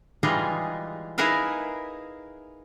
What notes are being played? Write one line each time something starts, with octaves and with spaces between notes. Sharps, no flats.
E3 G3 G#3 D#4 F4 G#4
D#4 E4 G#4 A#4 B4 F5